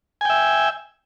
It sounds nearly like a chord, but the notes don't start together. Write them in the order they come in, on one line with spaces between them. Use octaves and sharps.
G#5 G5 E5